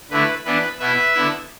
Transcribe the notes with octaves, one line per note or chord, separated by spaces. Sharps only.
D3 A3 E4 B4
E3 B3 D4 B4
B2 B3 E4 B4 E5
D3 B3 E4